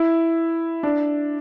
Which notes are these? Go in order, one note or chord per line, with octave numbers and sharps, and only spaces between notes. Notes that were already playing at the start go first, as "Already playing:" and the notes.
Already playing: E4
D4